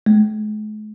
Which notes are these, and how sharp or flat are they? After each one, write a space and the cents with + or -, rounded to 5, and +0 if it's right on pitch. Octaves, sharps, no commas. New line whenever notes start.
G#3 +45